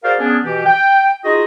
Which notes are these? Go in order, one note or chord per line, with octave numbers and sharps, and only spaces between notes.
F#4 G#4 A#4 C5 D5 F5
B3 C#4 D4 G#4
B2 E3 G4
G5
D#4 F4 F#4 G#4 D#5